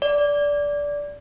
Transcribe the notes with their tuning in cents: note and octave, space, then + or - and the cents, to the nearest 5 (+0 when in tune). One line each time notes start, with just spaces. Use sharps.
D5 -15